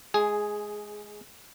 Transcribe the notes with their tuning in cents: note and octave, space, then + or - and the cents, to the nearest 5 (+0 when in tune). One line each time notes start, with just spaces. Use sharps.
G#3 +20 G#4 +0